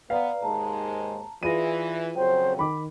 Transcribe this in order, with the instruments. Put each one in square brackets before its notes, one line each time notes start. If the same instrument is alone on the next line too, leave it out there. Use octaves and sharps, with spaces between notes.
[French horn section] B3 [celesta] B4 D5 A#5 [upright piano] F5
[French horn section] D#2 G#2 G#3 [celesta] A5 A#5
[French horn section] E3 [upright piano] F4 G#4 D#7 [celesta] D5 B5 A#6
[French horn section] F2 C#3 F#3 [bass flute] C5 [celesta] G5
[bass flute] D#3 [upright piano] B5 D6